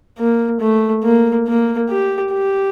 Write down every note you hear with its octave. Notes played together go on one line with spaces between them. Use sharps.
A#3
A3
A#3
A#3
G4
G4